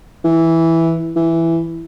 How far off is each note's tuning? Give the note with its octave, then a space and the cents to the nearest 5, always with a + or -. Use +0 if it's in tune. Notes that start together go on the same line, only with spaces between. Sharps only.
E3 -5
E3 +5